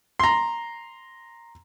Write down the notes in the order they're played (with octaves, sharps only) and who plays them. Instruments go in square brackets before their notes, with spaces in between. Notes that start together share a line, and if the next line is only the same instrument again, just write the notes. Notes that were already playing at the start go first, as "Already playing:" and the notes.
[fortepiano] A#5 C6